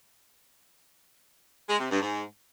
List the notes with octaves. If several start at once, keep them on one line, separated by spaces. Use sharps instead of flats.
G#3
C3
G2
G#2